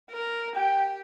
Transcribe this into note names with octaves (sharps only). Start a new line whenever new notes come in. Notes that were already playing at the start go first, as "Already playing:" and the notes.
A#4
G4 G5